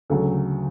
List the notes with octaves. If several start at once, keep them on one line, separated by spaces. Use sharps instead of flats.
D2 C#3 F#3 A4